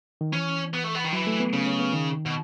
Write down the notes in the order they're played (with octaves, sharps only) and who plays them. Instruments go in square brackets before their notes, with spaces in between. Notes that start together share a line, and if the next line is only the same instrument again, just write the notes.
[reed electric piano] D#3
[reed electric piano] E3 [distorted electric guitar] C#4
[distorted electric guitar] B3
A3
B3
D#3
[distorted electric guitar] E3 [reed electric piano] F#3
[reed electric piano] A3
B3
[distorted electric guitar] C#3 [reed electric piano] C#4
[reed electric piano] C#4
B3
D#3
[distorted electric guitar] B2